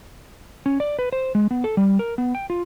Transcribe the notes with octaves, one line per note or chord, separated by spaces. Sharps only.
C#4
D5
B4
C5
G#3
B3
A4
G3
A#4
B3
G5
F4